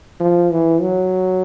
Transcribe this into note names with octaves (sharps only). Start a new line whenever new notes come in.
F3
E3
F#3